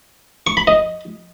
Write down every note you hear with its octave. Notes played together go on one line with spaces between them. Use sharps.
C#6
B5
D#5